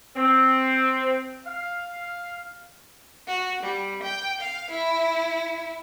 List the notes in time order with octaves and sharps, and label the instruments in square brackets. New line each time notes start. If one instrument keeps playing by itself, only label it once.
[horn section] C4
F5
[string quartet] F#4
G3
G5
F5
E4